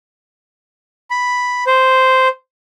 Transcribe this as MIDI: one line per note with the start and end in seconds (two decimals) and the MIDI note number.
1.11 1.64 83
1.67 2.28 72